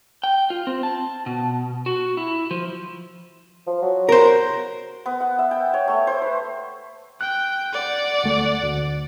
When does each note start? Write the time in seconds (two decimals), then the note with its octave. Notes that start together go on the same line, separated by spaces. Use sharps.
0.23 G5
0.50 F4
0.67 C4
0.83 A5
1.26 B2
1.86 F#4
2.17 E4
2.51 F3
3.67 F3
3.82 F#3
4.09 A#4 C5
5.06 B3
5.20 F#5
5.39 E5
5.51 G5
5.74 C#5
5.88 A3
6.07 C5
6.22 B4
7.21 G5 F#6
7.73 D5 F#5
8.24 D2 A3
8.63 D2